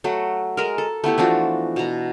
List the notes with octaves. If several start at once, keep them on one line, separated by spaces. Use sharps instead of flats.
F#3 A3 F#4
G#3 A#4
A4
A3 B3 E4 G4
E3 F3 D4 F#4
B2 A#5